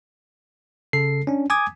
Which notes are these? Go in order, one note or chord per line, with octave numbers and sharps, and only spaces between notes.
C#3 A4 C7
C#4 D4
G#5 D6 D#6 G#6